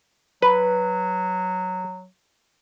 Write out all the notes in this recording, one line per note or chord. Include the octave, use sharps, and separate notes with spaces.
F#3 B4